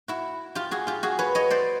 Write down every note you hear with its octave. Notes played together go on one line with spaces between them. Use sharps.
E4 F#4
F4 G4
F#4 G#4
F4 G4
F#4 G#4
B4 C#5
C#5 D#5
C5 D5